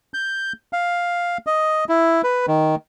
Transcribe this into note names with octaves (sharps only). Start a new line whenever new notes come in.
G6
F5
D#5
E4
B4
D#3